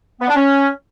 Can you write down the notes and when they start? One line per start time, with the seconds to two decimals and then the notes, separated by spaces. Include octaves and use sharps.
0.21 B3
0.28 D4
0.36 C#4